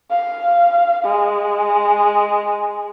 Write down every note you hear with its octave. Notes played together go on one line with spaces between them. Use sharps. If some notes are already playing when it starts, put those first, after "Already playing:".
F5
G#3